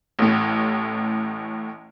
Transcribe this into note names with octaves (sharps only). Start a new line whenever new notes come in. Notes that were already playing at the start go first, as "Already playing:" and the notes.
A1 A2